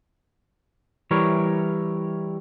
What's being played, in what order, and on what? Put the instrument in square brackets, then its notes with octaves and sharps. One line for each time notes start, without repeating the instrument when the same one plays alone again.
[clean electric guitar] E3 G3 E4 A#4 C#5